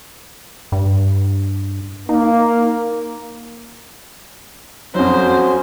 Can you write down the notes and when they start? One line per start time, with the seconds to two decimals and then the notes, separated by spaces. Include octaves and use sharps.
0.72 G2
2.09 A#3 D#4
4.95 F2 F#3 C#4 F#4 C5